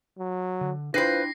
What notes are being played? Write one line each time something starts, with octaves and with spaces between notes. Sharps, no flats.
F#3
D3
D4 E4 F4 B4 C5 G5 A#6 C7